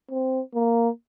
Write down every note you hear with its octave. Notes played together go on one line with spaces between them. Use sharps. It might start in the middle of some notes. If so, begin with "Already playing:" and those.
C4
A#3